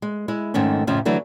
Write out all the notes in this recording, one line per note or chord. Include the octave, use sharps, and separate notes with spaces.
G#3
G#3 E4
F2 G#2 D#3 A3 C#4
F2 A2 C#3 F3 C#4
D3 E3 F#3 A3 D4